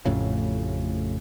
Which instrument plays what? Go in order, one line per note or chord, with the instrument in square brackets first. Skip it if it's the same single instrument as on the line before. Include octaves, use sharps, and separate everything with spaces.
[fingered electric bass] A1 F2 A2 C#3